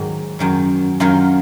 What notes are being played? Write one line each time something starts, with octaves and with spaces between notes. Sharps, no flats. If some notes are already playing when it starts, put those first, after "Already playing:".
Already playing: G#2 D#3 F#3
F#2 D#3 F#3
F#2 D#3 F#3 F4